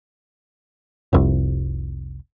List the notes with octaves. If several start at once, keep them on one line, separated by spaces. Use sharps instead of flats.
F1 C2